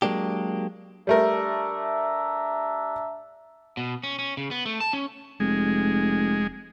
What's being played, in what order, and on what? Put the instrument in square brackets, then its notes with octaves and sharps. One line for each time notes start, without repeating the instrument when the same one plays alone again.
[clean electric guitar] F#3 G#3 A#3 D4 G4
[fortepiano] G3 A3 A#4 [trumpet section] D4 E5 A#5
[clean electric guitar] B2
C#4
C#4
C#3
B3
A3
A5
C#4
[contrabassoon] F1 [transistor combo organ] G#3